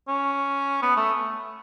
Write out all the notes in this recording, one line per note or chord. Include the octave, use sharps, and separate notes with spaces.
C#4
B3
A3